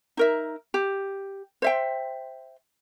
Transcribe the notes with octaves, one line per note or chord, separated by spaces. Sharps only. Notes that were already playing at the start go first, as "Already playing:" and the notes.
D#4 A#4 E5
G4
C5 E5 G5